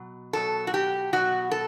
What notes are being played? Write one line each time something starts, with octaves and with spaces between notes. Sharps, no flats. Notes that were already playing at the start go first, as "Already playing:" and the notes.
Already playing: B2 F#3
B2 F#3 A4
F#4
G4
B2 F#3 F#4
A4